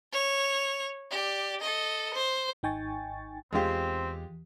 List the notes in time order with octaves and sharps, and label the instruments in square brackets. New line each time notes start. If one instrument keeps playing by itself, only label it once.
[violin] C#5 F7
G4 D5
A4 D#5
C5
[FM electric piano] G#1 D#4 G5 G#5 C#6 A6
[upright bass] E2 [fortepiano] G#3 F4 G4 [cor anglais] C4